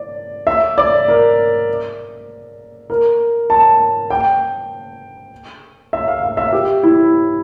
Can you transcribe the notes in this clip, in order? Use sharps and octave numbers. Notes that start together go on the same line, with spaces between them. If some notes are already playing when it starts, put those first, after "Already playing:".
Already playing: D5
E5
D5
A#4
A#4
A5
G5
E5
F5
F5
E5
G4
E4